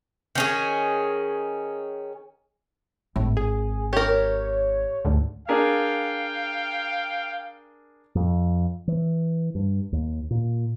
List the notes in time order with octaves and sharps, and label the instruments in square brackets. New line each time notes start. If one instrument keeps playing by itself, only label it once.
[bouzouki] D#3 C#4 G#4
[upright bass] G#1 [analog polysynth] A2
[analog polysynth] G#4
[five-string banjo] G4 A#4 [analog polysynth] C#5
[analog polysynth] D2 G#2 D3
[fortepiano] D4 G#4 A#4 [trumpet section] F5 G5
[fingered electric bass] F2
E3
G2
D#2
A#2